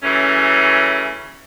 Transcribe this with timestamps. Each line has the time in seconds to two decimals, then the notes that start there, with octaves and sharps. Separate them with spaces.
0.03 C#3 E3 F#3 A3 C#4